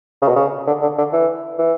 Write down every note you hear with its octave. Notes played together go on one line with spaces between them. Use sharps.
C#3
B2
C#3
D3
D3
D3
E3
E3